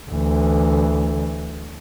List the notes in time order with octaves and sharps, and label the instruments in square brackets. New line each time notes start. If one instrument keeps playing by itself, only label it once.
[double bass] D2 E3